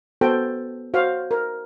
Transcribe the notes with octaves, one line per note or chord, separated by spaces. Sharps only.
B3 F#4 A4 C5 G5
F#4 C5 F5
A#4